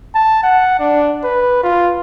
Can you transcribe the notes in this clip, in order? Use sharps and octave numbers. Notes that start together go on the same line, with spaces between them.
A5
F#5
D4
B4
F4